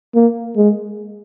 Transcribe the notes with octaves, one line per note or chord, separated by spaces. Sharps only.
A#3
G#3